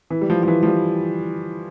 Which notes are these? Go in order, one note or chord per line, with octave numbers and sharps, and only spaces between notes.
E3
G3
F3
F3
E3
F3
G3